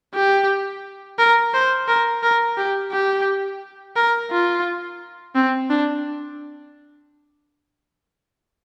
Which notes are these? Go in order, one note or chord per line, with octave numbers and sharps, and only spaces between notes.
G4
A#4
C5
A#4
A#4
G4
G4
A#4
F4
C4
D4